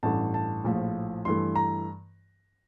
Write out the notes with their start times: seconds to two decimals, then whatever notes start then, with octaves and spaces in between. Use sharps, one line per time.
0.03 A1 G2 E3 A3 A5
0.34 A5
0.65 A#1 A2 F3
1.25 G2 E3 A3 C6
1.56 A#5